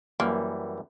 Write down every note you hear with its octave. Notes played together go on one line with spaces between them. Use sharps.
F#2 E3 G3 A#3